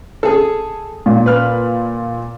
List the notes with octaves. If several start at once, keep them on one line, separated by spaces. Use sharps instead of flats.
G#4 A4
A#2
B4 F6